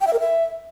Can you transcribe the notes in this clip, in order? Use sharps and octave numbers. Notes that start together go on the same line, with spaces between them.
G5
E5
A#4
E5